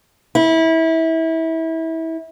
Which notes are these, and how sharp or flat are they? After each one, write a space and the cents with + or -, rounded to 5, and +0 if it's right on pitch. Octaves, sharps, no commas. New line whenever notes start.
E4 -25